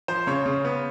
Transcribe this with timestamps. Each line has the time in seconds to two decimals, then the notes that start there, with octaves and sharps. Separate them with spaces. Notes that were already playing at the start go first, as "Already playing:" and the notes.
0.08 F3 C5
0.27 C#3 C#5
0.46 C#3
0.65 B3